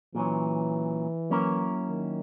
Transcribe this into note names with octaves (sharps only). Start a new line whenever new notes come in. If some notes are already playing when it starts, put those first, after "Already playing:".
A#2 E3 F#3 C#4
F#3 A#3 C#4 E4 A#4
D#3